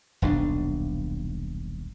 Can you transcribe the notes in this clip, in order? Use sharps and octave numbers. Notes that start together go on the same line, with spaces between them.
D#1 B1 C#4 D4